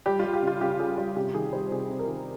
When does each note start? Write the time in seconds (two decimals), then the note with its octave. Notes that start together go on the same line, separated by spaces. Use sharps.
0.06 G3 G4
0.19 G3 F4
0.33 G4
0.42 C#3 F4
0.61 C#3 G4
0.79 G3 G#4
0.97 G3 F4
1.16 C3 G4
1.34 D#3 G#4
1.53 G3 C5
1.71 C3 G#4
1.90 C3
1.99 A#4
2.08 D#3